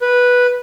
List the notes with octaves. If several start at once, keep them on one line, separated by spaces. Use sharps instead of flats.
B4